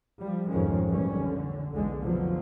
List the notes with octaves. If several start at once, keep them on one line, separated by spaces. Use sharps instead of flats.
F3 G3
C2 F2 G#2 D#3 G#3 C#4
F1 B1 A#2 E3 G3 C#4
D3
B1 E2 D3 G#3
F1 B2 D3 F3 F#3